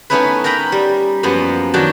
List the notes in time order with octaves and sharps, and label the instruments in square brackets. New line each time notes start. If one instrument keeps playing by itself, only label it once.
[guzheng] A3 B3 C#4 D#4 E4 B4
A#4 D#5 G5 A#5 B5
G3
F#2 F3 A#3 B3
D#3 F#3 D4 F#4 G5 A5